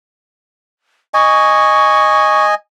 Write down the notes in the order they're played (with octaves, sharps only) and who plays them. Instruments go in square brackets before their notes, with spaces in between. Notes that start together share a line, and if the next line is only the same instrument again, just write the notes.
[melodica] D#5 G#5 [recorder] C#6